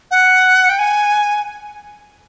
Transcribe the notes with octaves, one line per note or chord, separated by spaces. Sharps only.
F#5
G5
G#5